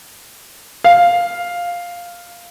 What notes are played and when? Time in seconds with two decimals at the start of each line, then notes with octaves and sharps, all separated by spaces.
0.84 F5